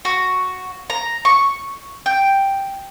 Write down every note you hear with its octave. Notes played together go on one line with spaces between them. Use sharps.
F#4
A#5
C#6
G5